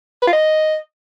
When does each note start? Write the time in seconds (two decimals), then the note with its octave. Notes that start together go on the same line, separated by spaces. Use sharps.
0.22 B4
0.27 F4
0.33 D#5